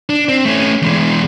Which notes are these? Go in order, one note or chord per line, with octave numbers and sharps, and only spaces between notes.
D4
C4
A3 C#4
E2 G#3